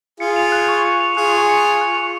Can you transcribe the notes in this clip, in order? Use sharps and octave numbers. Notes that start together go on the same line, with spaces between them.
F4 G#4 C#7
F7
F#6
C#6
C#7
F7
F4 G#4 F#6
C#6
C#7
F7
F#6
C#6